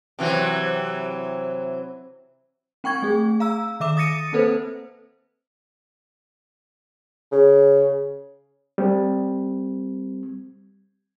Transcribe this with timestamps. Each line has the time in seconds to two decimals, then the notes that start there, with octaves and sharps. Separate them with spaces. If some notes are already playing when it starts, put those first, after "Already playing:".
0.19 C3 E3 F#3
2.84 C4 G5 C#6 G#6
3.02 A3 G#4
3.40 F5 A#5 E6
3.80 D#3 E5 D6 E7
3.97 D#6 A6 A#6 C#7 D#7
4.33 A#3 C4 A4 B4 C5
7.32 C#3
8.78 G3 C4